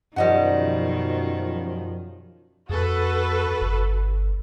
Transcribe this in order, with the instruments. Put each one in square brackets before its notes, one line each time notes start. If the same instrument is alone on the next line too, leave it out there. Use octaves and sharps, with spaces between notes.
[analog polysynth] F#2 F3 [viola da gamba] B2 D#3 [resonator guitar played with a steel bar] G3 D#5 F#5
[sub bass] F2 [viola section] F#4 A4 B4
[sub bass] G1